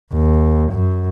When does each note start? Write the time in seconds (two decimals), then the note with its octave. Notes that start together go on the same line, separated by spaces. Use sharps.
0.13 D#2
0.72 F#2